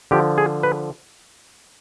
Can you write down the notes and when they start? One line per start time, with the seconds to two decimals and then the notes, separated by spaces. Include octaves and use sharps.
0.11 D3 F3 G4
0.38 G#4
0.63 B4